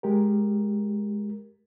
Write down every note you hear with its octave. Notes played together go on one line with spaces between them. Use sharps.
G#3 G4 A#4